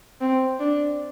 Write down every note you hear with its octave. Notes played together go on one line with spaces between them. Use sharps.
C4
D4